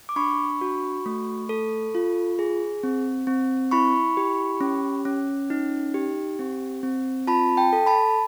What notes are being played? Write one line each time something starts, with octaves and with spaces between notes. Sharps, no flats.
D6
D4 B5 C#6
F#4
A3
A4
F4
G#4
C4
C4
E4 B5 C#6
G4
C#4
C#4
D#4
G4
C4
C4
F4 A5 B5
G5 A5
A4
A5 B5